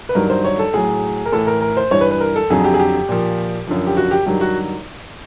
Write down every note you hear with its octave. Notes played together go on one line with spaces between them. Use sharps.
B4
G2 D#3 F#3 A#4
C5
C#5
A4
A2 F#3 G#4
A#4
A2 E3 A4
A#4
A#4
C5
G2 E3 C#5
B4
B4
A#4
A4
F2 D3 F#3 G#4
G4
G#4
G4
A#2 F3
F#2 D3 F3
G4
F#4
G4
G2 D#3 F#3 G4
F#4